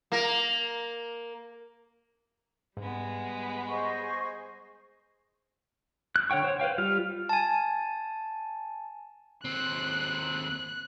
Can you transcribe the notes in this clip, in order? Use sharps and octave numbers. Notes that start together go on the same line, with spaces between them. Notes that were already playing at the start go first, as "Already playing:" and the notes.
A#3 A#4
G#2 G3 G#3 B3
G#4 C5 D#5 C#6
F#6
D3 C#5 F#5 G5 C#6
C5 C#5
B4 C5 F5 G5
G3 F4 F5
G#5 A5
D#2 C4 F#6